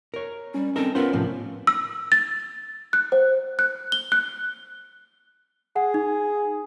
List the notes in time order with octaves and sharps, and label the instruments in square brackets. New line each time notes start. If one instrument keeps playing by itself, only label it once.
[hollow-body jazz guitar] A#4 C#5
[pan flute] G3 [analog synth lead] C#4
[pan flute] C4 [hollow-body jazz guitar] D#4 A4 A#4
[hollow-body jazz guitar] B3 F4 C5 [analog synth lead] C#4 [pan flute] A#4
[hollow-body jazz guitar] A2 C3 F3
[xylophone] E6
A6
F#6
C5
F#6
G7
F#6
[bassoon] G#4 [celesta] F#5
[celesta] D#4